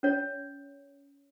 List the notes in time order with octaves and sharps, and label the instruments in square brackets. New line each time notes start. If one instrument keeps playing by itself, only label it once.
[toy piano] C#4 C#5